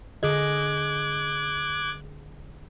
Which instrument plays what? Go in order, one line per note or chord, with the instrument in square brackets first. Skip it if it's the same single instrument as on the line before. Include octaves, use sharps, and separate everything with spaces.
[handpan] D3 G#4 D#5 [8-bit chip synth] D6 F#6 G#6